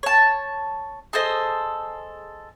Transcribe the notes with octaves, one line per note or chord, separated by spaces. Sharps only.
C#5 A5
G#4 A4 C5 D#5